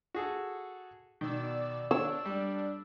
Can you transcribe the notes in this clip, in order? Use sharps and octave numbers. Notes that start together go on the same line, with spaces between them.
F#4 G#4 A4
B2 D#3 D5 E6
D4 C#5 E6
G3